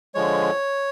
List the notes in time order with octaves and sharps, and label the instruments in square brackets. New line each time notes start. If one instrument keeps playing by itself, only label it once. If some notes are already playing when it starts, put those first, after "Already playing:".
[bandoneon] D3 F3 G#3 C#5